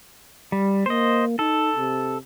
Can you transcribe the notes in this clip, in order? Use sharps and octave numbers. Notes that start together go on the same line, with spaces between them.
G3
A#3 C5 D#5
D#4 A4
C3